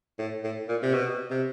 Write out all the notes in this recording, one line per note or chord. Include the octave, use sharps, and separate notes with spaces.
A2
A2
A#2
C3
B2
C3